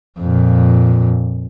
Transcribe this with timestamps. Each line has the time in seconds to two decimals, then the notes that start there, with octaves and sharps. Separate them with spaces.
0.20 F2 A#2